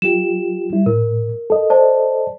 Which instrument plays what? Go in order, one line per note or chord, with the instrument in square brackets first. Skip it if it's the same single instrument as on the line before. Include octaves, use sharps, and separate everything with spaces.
[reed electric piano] F#3 F4 G4 [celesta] E7
[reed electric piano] G3 E4
[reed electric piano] A2 [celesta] A#4
[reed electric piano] A4 D#5
[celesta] C5 D5 A5